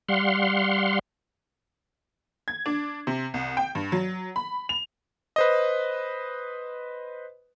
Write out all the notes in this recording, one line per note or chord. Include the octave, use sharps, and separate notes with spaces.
G3 F5 F#5 C6
G#6
D4
C3
C2
G5
G2
F#3
B5
F7
B4 C5 D#5